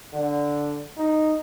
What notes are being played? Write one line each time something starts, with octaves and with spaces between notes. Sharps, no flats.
D3
D#4